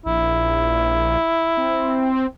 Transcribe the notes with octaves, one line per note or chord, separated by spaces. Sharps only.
A#1 E4
C4